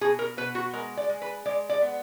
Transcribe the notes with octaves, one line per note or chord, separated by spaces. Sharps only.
B2 G#4
A#4
B2 B4
F#4
G#3 A#4
D5
G#3
B4
G#3 D5
D5
B3